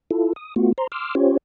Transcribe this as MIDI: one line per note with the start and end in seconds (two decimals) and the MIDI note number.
0.11 0.33 64
0.11 0.33 65
0.11 0.33 69
0.36 0.54 87
0.56 0.73 57
0.56 0.73 59
0.56 0.73 65
0.56 0.73 66
0.78 0.87 72
0.78 0.87 82
0.78 0.87 84
0.92 1.15 84
0.92 1.15 86
0.92 1.15 88
0.92 1.15 89
1.15 1.37 61
1.15 1.37 65
1.15 1.37 67
1.15 1.37 72
1.15 1.37 73